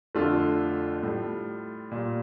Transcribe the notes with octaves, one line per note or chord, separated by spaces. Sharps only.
F2 D3 A3 F4
A2 G3
A#2 G3